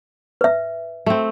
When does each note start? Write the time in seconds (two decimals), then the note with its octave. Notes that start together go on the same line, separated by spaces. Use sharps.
0.41 B4 E5
1.06 A3 C4